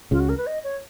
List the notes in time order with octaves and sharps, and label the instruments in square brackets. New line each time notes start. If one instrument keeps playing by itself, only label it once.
[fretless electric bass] C#2 C#3 [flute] F4
[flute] F#4
A#4
B4
D#5
C#5